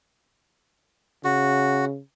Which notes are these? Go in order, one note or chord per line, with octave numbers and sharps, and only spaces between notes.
C#3 F#4